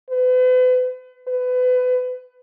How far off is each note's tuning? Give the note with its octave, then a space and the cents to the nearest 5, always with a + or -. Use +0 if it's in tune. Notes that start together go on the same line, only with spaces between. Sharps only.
B4 +40
B4 +30